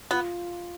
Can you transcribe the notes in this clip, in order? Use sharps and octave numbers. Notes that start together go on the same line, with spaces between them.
B3 F4